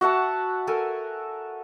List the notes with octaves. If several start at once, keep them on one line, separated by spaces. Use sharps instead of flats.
F#4 E5 F#5 A5
A4 A#4 G#5